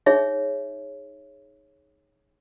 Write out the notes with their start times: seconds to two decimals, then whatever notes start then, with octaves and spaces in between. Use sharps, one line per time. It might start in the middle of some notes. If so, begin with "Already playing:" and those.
0.06 D#4 G#4 C#5 E5